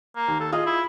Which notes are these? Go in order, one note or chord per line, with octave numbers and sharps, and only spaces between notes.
A#3
D#2
A4
F4 G#4 D#5 F6
E4